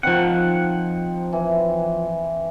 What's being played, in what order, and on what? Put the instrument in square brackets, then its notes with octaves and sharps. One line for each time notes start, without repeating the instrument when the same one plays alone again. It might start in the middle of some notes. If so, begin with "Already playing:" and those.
[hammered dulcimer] D#3 C4 [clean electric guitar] F3 F#5
[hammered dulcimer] E3